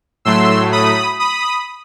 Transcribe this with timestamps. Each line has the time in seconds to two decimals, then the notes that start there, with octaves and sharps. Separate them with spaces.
0.25 A2 F#3 A3 C6 E6
0.72 B5 D#6
1.19 B5 D#6